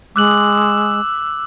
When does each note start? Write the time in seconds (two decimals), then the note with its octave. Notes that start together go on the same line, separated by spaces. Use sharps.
0.16 G#3 D6 E6 F#6 F#7